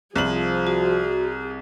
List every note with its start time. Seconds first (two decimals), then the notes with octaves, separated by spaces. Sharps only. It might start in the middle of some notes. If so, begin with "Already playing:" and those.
0.16 C2 F3 F4 G#4 F#7
0.67 F#4